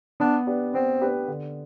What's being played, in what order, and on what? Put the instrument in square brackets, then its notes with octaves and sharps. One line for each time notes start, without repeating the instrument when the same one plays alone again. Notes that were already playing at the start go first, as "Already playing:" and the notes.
[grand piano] B3 [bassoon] D4
[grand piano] D4 G4 B4
[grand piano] B3 [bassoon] C4
[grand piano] D4 G4 B4
D3